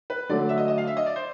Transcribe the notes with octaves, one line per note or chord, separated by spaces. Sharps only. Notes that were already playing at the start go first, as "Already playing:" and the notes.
B4
D3 F#3 A3 D5
E5
D#5
D#5
F5
E5
D#5
D5
C5